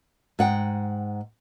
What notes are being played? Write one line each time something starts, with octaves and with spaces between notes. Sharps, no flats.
G#2 F#5 G5